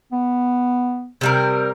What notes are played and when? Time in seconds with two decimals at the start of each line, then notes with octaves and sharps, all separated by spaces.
0.12 B3
1.21 C3 G3 A#4